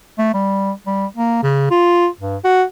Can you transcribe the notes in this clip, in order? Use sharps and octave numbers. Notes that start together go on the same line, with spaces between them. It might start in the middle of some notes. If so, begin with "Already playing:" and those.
A3
G3
G3
A#3
C#3
F4
G2
F#4